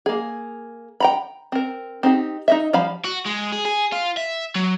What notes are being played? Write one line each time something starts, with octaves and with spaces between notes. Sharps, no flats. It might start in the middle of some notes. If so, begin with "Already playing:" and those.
A#3 G#4
G5 A#5 B5
C4 A#4
C4 D#4 G4
D#4 D#5 E5
F3 G3 F5 B5
F#4
G#3
G#4
G#4
F4
E5
F#3